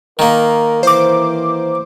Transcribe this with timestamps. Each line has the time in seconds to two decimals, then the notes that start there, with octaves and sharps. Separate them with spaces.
0.19 D#3 A#3 A#4
0.83 E3 C5 D6